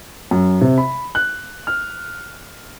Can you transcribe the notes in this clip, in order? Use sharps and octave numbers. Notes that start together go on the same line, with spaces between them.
F#2
C3
B5
F#6
F6